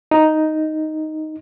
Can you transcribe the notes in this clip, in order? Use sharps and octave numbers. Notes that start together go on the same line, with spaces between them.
D#4